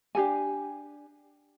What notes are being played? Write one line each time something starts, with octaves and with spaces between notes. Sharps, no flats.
D4 G4 A4 G#5